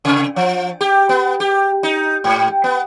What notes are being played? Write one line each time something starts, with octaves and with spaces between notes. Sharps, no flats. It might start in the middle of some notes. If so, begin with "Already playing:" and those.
C3
F3
G4
B3
G4
D#4
G#2
B3